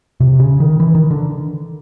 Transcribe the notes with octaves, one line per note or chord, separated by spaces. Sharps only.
C3
C#3
D#3
E3
D#3
D3